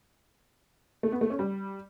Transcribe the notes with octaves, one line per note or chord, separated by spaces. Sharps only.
A3
B3
A3
C#4
G3